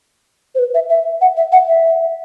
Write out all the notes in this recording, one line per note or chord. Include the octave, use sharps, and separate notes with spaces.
C5
B4
E5
E5
F#5
E5
F#5
E5